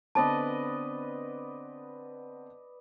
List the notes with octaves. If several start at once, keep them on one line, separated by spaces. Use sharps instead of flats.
D3 B3 C4 B4 D5 D#5 A5